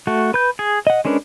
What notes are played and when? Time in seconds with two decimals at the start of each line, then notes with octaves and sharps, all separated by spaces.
0.07 A3 F#4
0.34 B4 G6
0.59 G#4
0.87 D#5 F#5
1.05 G#3 C#4 D4 A#4 B4